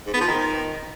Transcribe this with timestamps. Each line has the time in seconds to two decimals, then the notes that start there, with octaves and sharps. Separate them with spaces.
0.06 G#2
0.14 B3
0.21 F3
0.28 D#3